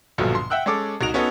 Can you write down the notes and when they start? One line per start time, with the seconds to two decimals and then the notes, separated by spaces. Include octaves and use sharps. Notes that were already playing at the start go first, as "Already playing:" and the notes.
0.18 A#1 G2 B2 D3 F3 F#3
0.35 C6
0.50 E5 F#5 G5 E6 F#6
0.66 G#3 C#4 A4 D6
1.01 C2 D#4 F#4 D7 F7
1.14 B3 C#4 D#4 F#4 A4